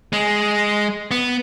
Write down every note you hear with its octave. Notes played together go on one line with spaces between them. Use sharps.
G#3
B3